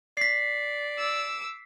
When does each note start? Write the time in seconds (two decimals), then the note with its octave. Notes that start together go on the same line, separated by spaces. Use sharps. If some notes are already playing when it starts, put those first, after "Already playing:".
0.17 D5 B6 C7
0.98 D6 E6